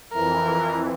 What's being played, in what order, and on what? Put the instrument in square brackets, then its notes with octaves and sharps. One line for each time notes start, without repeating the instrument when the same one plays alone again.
[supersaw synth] F2 E3 [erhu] A#4